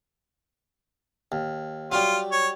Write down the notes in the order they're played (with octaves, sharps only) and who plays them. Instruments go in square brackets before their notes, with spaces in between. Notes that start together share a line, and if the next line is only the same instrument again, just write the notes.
[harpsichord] D#2
[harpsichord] F#3 G3 [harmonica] F4
[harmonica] C#5